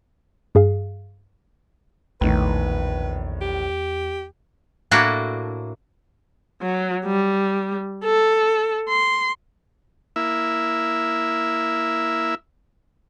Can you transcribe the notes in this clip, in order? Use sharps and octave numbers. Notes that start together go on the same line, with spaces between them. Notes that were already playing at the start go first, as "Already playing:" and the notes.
G2 G#4 F5
A#1 E2 A2 D#3 B4
G4
A2 A#3 D4 E4 F#4
F#3
G3
A4
C6
A#3 E4 E5